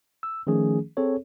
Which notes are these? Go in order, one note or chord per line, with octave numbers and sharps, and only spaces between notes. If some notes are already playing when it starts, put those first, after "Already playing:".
E6
D#3 F3 A3 C#4 G#4
C4 G#4 A4 C#5